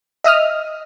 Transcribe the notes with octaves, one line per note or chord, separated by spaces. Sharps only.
D#5 E5 D#6 F6